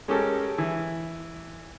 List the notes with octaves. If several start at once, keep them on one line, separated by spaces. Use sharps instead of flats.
G#3 C#4 G4 A4 A#4
E3